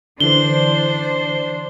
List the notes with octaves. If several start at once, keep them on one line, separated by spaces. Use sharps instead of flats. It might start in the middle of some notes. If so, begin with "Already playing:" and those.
D3 E3 D4 C5 G7